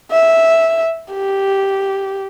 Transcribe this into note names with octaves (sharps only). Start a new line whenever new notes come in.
E5
G4